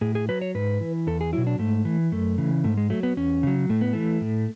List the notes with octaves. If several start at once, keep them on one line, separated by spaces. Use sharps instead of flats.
A2 G#4
G#4
F#3 B4
C#5
G#2 B4
E3
E2 A4
G#4
B2 F#3 E4
D4
G#2 A3
E3
F#2 A3
C#3 E3
G#2 A3
G#3
F#3 A3
B3
E2 C#4
C#3 F#3
A2 A3
B3
E3 A3
A2